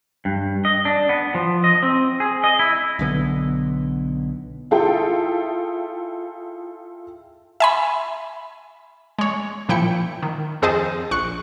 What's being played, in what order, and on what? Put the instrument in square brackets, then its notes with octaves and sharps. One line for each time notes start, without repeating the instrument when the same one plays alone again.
[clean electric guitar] G2
D#5
D4
B3
F3
D#5
C4
G#4
D#5
E4
[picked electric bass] B1 D3 B3
[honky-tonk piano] E4 F4 G#4 A4 G5
[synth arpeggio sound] E5 G#5 B5
G#3 C#5
A#2 F3 E4 G5 C#7
D#3
F2 C4 G#4 C5 D#5 A5
A#1 C#6 F#6 C#7